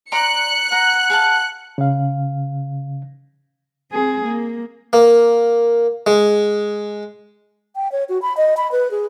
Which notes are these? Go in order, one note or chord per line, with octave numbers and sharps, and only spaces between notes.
D5 A#5 C6 F#6 C#7
F#5 A#5
G#4 F5 A5
C#3 F5
C4 G#4
A#3
A#3
G#3
G5
C#5
F#4
B5
D#5
B5
B4
G#4